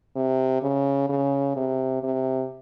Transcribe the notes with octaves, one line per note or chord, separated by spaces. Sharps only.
C3
C#3
C#3
C3
C3